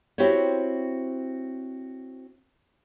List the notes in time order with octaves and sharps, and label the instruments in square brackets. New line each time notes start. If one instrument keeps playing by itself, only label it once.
[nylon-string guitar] C4 E4 F#4 G4 C5 C#5